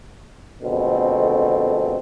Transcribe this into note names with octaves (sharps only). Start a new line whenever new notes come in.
F2 B2 D3 G#3 A3 C4